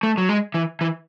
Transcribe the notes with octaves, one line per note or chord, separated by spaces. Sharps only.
A3
F#3
G#3
E3
E3